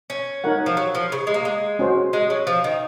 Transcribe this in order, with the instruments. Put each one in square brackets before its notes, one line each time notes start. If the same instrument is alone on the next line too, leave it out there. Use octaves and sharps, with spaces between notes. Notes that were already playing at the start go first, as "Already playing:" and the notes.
[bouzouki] C#4
[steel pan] D#4 A#4 C#5 F#5
[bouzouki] F3
F#3
F3
C#3
G#3
A#3
G#3
[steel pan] C#4 F#4 C5
[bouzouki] G#3
F#3
F3
D#3